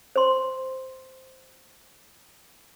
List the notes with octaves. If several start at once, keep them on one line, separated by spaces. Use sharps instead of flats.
C5 C6